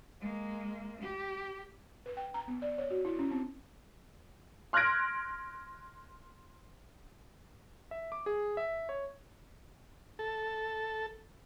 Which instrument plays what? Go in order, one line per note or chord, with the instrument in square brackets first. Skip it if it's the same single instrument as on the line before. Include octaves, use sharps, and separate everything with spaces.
[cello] G#3 A#3
G4
[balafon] B4
G5
A#5
B3
D5
C#5
F#4
E4
C#4
C4
[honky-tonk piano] C6 F6 F#6 G#6 A#6 D7
[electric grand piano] E5
D6
G#4
E5
C#5
[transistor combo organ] A4